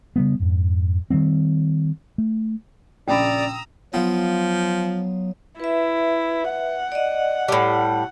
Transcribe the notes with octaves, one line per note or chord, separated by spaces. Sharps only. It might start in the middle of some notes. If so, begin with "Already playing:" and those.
C#3 G3 B3
F2 G#2
D#3 E3 G3 C4
A3
A#1 C#3 D5 G5 A#5 B5 D#6 E6
F3 F#3 B3 F4
E4 B4 E5
F#5
D5 D#5
A2 G3 A5